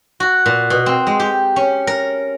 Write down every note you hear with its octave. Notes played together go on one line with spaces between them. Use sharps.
F#4
A#2
B2
C4
G#3
G4
C#4
A#4